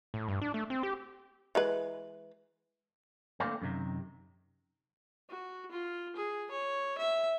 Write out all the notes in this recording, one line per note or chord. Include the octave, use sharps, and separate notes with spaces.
A2
G2
D4
A3
C4
G4
E3 G#3 B4
D3 A3 A#3 C4
F#2 C3 D#3
F#4
F4
G#4
C#5
E5